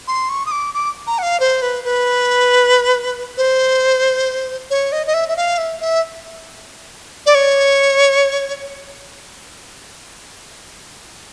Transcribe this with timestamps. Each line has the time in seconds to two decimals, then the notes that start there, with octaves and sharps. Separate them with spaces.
0.08 C6
0.29 C#6
0.46 D#6
0.51 D6
0.74 D6
1.07 A#5
1.18 F#5
1.23 F5
1.40 C5
1.62 B4
1.84 B4
3.37 C5
4.70 C#5
4.92 D#5
5.06 D#5
5.14 E5
5.29 E5
5.37 F5
5.58 E5
5.80 E5
7.26 D5
7.35 C#5